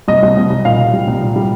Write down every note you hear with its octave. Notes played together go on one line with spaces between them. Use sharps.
C2 D#5
C2
C2
C2
A#2 F5
A#2
G3
C2
A#2
G3